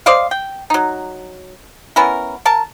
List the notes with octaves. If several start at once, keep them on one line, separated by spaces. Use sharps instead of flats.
C5 D5 D#5 F5
G5
F#3 D#4
B3 C#4 E4 A#4
A#4 A5